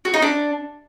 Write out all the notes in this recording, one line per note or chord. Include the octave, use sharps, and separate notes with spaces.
F#4
D#4
D4